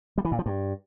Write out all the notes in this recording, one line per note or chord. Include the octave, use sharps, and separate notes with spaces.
G3
E3
A#2
F3
G2